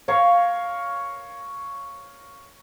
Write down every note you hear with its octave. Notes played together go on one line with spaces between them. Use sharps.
A#4 C#5 F5